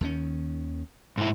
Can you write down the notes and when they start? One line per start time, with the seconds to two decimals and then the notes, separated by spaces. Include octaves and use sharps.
0.01 D#2 D#3 C#4
1.18 G#2 E4